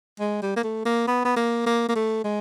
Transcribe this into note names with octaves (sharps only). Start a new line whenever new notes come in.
G#3
G3
A#3
A3
A#3
B3
B3
A#3
A#3
A#3
A3
G#3